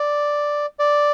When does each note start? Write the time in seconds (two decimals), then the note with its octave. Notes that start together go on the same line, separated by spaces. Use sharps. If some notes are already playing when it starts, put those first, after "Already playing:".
Already playing: D5
0.79 D5